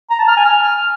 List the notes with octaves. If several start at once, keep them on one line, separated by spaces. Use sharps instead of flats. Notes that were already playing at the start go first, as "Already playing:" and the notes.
A#5
A5
F6
G#5
F6